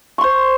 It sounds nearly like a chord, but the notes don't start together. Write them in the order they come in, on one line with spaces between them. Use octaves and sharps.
C#6 C6 C5